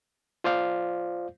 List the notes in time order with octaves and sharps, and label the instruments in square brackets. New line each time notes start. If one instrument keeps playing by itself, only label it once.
[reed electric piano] F4 C5 D5 F5